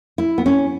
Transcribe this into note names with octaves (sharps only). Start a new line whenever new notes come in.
E4
B3
C#4